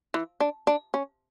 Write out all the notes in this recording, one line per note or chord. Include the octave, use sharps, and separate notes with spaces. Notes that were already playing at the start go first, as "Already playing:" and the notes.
E3
D4
D4
C#4